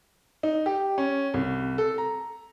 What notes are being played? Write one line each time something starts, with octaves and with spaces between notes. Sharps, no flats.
D#4
G4
C#4
C2
A4
A#5